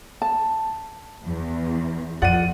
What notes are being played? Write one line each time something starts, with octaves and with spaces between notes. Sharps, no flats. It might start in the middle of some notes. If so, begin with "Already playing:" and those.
A5
E2
F2 F4 D5 F#5 D#7